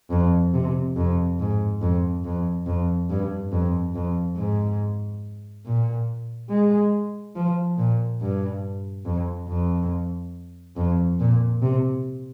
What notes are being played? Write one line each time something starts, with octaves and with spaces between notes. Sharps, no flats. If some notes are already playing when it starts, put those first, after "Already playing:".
F2
C3
F2
G#2
F2
F2
F2
G2
F2
F2
G#2
A#2
G#3
F3
A#2
G2
F2
F2
F2
A#2
C3